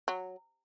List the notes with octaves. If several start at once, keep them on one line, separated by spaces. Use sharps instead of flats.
F#3